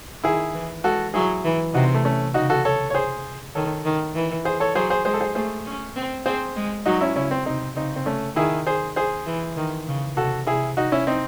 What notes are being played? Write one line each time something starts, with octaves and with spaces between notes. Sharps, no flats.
D#3 E4 G#4
E3
G#3 F#4 A4
F#3 E4 G#4
E3
C3 D#4 F#4
C4
A3
A3 C#4
C#3 D#4 F#4
F#4 A4
A4 C#5
C#5
G#4 C5
D#3 A4 C#5
D#3
E3
G#4 C5
A4 C#5
F#3 G#4 C5
G#4 C5
G#3 G#4 C5
A4
G#4 C5
A3 G#4 C5
C#4
C4
C4 G#4 C5
G#3
F#3 D#4 F#4
C#4 E4
C#3 C#4 E4
C4
C3 C4 D#4
C#3 C4 D#4
C4
A3 C#4
D#3 E4 G#4
G#4 C5
G#4 C5
E3
D#3
C#3
C3 F#4 A4
C3 E4 G#4
D#4 F#4
C#4 E4
C4 D#4